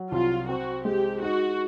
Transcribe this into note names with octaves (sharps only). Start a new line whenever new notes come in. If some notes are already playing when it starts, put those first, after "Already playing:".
Already playing: F#3
C2 F4
C4 F#4
G#3 G4
D#4 F#4